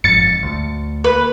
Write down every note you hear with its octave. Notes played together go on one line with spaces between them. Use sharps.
F#1 F2 G#2 A6 C#7
D2
A#3 B4